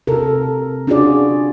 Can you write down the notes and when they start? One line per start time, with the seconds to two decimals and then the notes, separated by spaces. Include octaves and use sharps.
0.07 C3 A4 A#4
0.87 C#4 D4 F4 F#4 G#4 D5